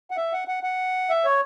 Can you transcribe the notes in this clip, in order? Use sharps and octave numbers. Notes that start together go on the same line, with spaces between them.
F#5
E5
F#5
F#5
F#5
E5
C#5